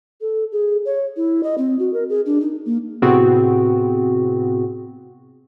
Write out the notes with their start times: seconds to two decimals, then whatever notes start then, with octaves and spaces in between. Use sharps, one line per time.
0.21 A4
0.52 G#4
0.85 C#5
1.16 E4
1.43 D#5
1.58 C4
1.79 F#4
1.93 A#4
2.09 G#4
2.26 D4
2.41 D#4
2.66 A#3
3.02 A2 C3 B3 C4 F#4 G#4